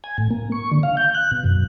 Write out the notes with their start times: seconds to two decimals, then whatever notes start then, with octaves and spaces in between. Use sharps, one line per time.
0.04 G#5
0.18 A2
0.31 A#3
0.52 C#6
0.72 D3
0.83 F5
0.97 G6
1.15 F#6
1.31 B2
1.44 F#2